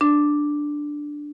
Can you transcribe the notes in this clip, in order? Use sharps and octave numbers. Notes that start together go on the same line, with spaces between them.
D4